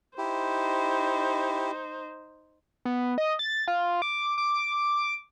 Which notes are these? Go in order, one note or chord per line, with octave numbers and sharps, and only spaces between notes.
D#4 E4 G4 C5
B3
D#5
A6
F4
D6
D6